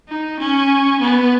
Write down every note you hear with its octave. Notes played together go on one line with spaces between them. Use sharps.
D#4
C#4
B3